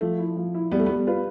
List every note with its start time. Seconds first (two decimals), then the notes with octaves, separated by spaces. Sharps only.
0.01 F3 A3
0.18 E4
0.37 F3
0.54 E4
0.72 G3 B3
0.80 A3
0.86 G3 B3
1.07 F4 B4